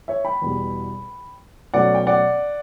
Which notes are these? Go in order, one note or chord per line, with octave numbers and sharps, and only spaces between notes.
C#5 E5
G5 B5
E2 B2 G3
B2 F#3 A3 C#4 D5 F#5
G5
D5 F#5